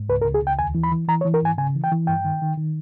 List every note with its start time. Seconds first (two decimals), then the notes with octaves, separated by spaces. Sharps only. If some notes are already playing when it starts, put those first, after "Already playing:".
Already playing: G#2
0.09 C#2 B4
0.22 A#4
0.25 C#2
0.34 G#4
0.43 C#2 G5
0.59 D#2 G#5
0.75 E3
0.83 B5
0.91 E3
1.08 E3 A#5
1.21 C#5
1.25 E3
1.34 A#4
1.42 G#2 G#5
1.58 C#3 G#5
1.75 E3
1.84 G5
1.92 E3
2.07 G2 G5
2.25 D#3
2.42 D#3
2.57 D#3